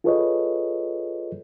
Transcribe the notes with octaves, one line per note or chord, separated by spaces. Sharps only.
F4 G#4 A4 B4 C#5 D#5